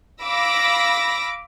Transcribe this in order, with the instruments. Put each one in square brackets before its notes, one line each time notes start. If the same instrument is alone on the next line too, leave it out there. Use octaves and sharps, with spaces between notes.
[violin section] F5 B5 D6 E6 A#6